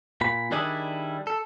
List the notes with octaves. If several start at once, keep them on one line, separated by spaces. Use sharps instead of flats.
A#2 B5
D#3 G3 D4 E4 G#4
A4